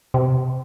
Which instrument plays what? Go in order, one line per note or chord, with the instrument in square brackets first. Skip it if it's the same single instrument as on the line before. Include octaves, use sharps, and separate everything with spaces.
[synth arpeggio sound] C3